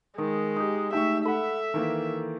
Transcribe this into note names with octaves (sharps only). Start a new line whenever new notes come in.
D#3 G#3 A#4 D#6
D#4 G4 D#6
A3 D#4 G4 E5 G5 C#6
A4 E5 F#5 B5
D#3 E3 A#3